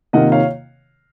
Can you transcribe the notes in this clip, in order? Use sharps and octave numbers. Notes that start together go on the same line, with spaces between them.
C3 D#3 A#3 F4 D#5 F#5
C#5 F5